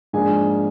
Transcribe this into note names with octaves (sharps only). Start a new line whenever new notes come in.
G#2 F3 A#3 D4 G#4 G#5